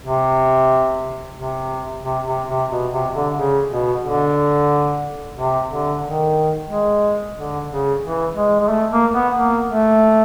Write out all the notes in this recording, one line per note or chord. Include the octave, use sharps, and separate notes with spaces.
C3
C3
C3
C3
C3
B2
C3
D3
C#3
B2
D3
C3
D3
D#3
G#3
D3
C#3
E3
G#3
G#3
A3
A#3
B3
A#3
A3